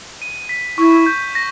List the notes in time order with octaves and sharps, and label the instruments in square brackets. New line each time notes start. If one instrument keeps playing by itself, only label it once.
[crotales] D#7
B6
[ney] E4 [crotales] C#6
[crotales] G6
A#6